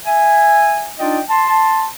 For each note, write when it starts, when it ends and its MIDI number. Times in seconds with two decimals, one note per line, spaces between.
0.05 0.90 76
0.05 0.90 80
0.99 1.19 62
0.99 1.19 63
0.99 1.19 65
0.99 1.19 74
0.99 1.19 75
0.99 1.19 79
1.29 1.86 81
1.29 1.86 84